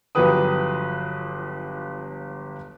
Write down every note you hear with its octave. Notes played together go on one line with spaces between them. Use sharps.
G1 F3 F#3 G4 B4 D#6